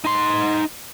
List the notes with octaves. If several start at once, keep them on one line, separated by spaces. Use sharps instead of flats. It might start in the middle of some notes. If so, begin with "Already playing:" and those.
D#4 C6